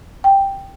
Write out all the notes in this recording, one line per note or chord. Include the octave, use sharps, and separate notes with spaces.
G5